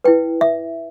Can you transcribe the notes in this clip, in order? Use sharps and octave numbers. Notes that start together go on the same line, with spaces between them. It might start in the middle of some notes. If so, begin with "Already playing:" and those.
E4 B4 G5
E5